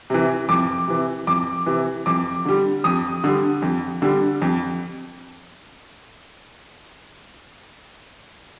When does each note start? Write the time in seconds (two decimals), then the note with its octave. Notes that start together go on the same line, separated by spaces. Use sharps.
0.10 C3 E3
0.49 F2 D6
0.88 C3 E3
1.27 F2 D6
1.66 C3 E3
2.06 F2 D6
2.45 D3 G3
2.84 F2 D#6
3.24 D3 G3
3.62 F2
4.02 D3 G3
4.42 F2